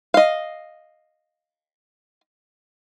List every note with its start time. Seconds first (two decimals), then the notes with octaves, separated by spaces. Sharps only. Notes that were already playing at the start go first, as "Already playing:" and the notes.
0.14 D#5 F5